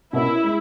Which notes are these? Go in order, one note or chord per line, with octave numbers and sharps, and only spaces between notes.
B2 A#3 C#4 E4
G#3